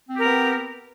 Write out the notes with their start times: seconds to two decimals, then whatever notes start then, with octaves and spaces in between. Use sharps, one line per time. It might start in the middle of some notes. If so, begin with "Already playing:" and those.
0.09 C4
0.14 G4
0.19 A#4
0.23 B3